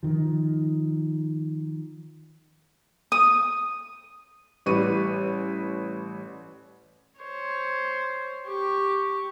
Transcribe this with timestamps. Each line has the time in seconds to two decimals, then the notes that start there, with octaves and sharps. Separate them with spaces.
0.03 D#3 F3
3.12 D#6
4.66 A1 G3 B4 C#6 D#7
7.20 C5 C#5
8.47 G4 C#6